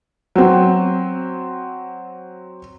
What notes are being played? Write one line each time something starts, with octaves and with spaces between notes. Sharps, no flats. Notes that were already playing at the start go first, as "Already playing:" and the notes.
F#3 C4